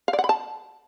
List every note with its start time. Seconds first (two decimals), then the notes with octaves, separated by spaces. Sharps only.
0.08 F5
0.13 D5
0.19 F#5
0.24 B5
0.29 A5